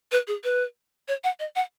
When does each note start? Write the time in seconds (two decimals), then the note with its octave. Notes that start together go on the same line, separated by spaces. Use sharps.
0.12 B4
0.28 G#4
0.44 B4
1.08 C#5
1.24 F#5
1.40 D#5
1.56 F#5